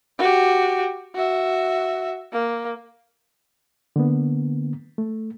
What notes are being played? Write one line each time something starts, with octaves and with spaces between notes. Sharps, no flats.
F#4 G4
F#4 E5
A#3
D3 A#3 B3
A3